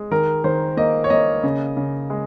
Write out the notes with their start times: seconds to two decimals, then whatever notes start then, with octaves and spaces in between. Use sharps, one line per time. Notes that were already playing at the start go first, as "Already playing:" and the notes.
Already playing: G#3
0.11 D#3 A#4
0.44 D#3 C5
0.77 A#3 D#5
1.04 C#5
1.10 A#3 D#5
1.43 C#3
1.77 C#3
2.10 G#3